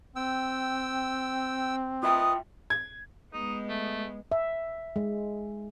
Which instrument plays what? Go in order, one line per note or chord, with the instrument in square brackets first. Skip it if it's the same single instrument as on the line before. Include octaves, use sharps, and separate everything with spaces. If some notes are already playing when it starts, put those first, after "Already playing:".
[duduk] C4 [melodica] G5 E6
[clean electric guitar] F4 E5 G5 [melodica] B4 D#5 [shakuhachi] D#6
[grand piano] G#6
[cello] G#3 B3 [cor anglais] D#4
[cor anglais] A3
[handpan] E5
G#3